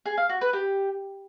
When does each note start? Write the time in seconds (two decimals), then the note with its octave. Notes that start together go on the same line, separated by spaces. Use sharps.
0.06 G#4
0.17 F5
0.29 F#4
0.41 B4
0.53 G4